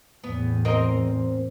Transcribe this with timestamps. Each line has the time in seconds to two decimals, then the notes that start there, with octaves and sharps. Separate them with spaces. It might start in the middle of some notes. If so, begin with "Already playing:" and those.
0.24 E2 A2 B3
0.65 C4 A#4 D#5